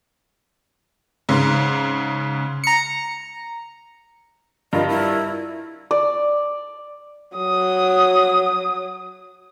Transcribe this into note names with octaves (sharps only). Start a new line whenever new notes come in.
G#2 C#3
A#5 C#7
G2 F4 A#4 D#5
E4
D5
F#3 D#6